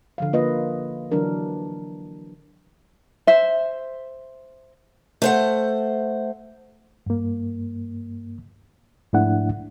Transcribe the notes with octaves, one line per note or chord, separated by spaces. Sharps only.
D3 F3 F5
A#3 F4 B4 D#5
D3 E3 F#3 D4 A#4
C5 E5
A3 C5 F#5
G2 A#3
G#2 F3 A3 D4 E4 F#5